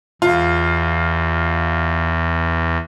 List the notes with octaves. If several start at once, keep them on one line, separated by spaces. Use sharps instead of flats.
E2 F4